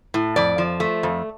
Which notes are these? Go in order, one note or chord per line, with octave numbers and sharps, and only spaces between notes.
A2
F2 D5
F3
A3
F2